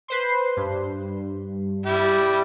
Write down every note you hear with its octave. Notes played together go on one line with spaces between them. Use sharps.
B4 C5 C6
G2
G3 E4 G4